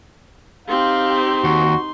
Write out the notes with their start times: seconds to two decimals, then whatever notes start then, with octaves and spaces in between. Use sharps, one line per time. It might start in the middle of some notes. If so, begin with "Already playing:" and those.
0.68 C4 D#4 G4 F5 C6
1.44 D#2 F#4